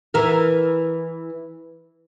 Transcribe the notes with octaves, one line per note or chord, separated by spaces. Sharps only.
E3 A#4